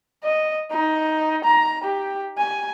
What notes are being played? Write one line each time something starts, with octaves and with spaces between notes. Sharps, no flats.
D#5
D#4
A#5
G4
G#5